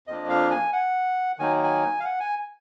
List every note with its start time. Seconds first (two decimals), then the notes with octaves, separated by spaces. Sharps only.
0.07 F2 F3 A#3 D4 D#5
0.29 F5
0.51 G#5
0.73 F#5
1.39 D#3 F#3 A#3 D#4 G#5
1.64 G#5
2.00 F5
2.05 F#5
2.20 G#5